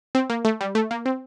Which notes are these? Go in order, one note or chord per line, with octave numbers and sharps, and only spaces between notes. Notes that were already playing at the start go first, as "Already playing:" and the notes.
C4
A#3
A3
G3
A3
A#3
C4